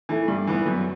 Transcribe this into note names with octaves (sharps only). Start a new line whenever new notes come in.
E3 A3
G2
E3 B3
F#2